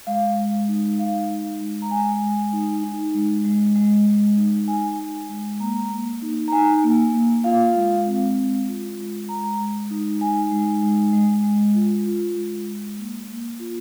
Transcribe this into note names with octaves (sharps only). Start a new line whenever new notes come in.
G#3 F5
G#3
D#4
D#4 F5
G#3
G#3
A#5
G#3 G#5
G#3
D#4
D#4
G#3
G#3
G#3
G#3
D#4
D#4 G#5
G#3
G#3
A#3 A#5
A#3
D#4
A#5
D#4 G#5
A#3
A#3
F4 F5
G#3
C4
G#3
F4
G#3
G#3 A#5
G#3
D#4
D#4 G#5
G#3
G#3
G#3
G#3
F4
F4
G#3
G#3
A#3
A#3
F4